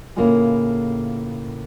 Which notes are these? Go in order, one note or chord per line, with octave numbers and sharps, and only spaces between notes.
A2 C#3 A#3 E4 F4 G#4